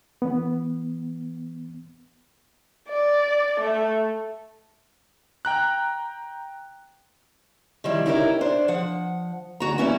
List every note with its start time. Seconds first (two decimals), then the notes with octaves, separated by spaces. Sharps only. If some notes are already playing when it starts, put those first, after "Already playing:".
0.22 E3 B3
2.89 D5
3.61 A3
5.45 G5 A#5 F#6
7.84 D#3 F3 G3 E4
8.06 C#4 D#4 E4 G4 G#4 A#4
8.41 D4 C5
8.68 F3 F#5
9.60 D2 F#4 A#5
9.78 G3 A#3 B3 C#4 E4 F#4